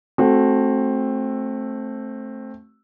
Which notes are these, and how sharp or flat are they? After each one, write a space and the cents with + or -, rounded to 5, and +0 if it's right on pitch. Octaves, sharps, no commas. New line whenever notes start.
A3 -5 C4 +15 F#4 +0